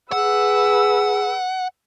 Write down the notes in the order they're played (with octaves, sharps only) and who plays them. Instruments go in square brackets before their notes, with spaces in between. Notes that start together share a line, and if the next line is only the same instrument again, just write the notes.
[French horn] G#4 [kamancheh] B4 E6 [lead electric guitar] F#5